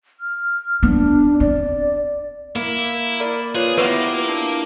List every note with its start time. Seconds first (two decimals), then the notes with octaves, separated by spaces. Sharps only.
0.20 F6
0.83 B3 D4
1.40 C4 D5
2.56 A#3 E4
3.20 A#4 D5 B5
3.55 F4 G#4 B4 C#5
3.78 A#3 B3 E4 F4 G4 B4 C7
4.29 D4